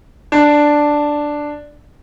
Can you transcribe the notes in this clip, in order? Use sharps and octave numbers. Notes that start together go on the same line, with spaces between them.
D4